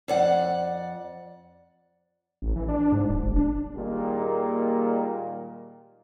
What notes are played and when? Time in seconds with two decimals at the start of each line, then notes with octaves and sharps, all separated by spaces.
0.08 F2 D5 F#5
2.42 A1
2.56 E3
2.68 D4
2.92 G#2
3.09 D#1
3.23 G1
3.36 D4
3.76 A#2 D#3 G3 G#3 A#3